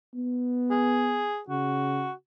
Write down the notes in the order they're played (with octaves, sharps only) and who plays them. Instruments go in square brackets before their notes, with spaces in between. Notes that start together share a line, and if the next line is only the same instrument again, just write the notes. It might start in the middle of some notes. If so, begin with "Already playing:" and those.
[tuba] B3
[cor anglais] G#4
[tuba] C#3 [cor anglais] F#4